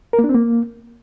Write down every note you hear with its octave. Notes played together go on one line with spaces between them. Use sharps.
A#4
A#3
D4
C4
A#3